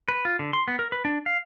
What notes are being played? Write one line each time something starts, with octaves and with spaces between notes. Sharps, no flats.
B4
F4
D3
C6
B3
A#4
B4
D4
F5